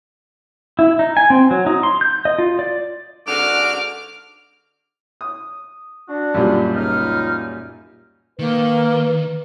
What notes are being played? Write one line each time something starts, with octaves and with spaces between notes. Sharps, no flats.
E4
D#4
G#5
C4
F#3
D#4
C6
G6
D#5
F4
D5
G#2 D3 F#4 D6 F6
D#6
D4 F#4
F#2 A#2 G3
C#2 D#4 F6
D#3 A#3 B4